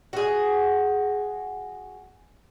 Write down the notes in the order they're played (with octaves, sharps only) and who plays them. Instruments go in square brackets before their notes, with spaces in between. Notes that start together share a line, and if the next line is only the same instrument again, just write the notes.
[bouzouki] F#4 G#4